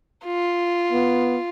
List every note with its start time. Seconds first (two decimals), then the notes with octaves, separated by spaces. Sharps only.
0.25 F4
0.93 B3